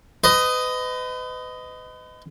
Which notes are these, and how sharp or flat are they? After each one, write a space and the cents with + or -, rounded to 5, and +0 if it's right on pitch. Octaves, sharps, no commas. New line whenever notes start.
B4 +35 D#5 +0